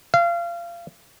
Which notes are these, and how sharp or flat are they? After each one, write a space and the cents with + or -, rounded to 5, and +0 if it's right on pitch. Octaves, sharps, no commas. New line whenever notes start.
F5 -25